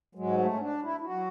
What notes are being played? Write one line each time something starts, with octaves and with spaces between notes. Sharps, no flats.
G#2 F#3 G#3
A3
C#4
D4
E4
E4
F#3 F#4